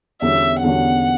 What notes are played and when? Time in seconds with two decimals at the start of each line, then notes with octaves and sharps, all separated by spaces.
0.22 E2 D3 G3 C#4 F#4 E5
0.63 E2 D3 G3 C#4 F#4 F#5